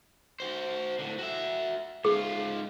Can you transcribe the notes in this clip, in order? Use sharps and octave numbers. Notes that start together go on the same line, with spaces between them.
F#4 C5
A2 D3
F#4 E5
G#2 F4 G#4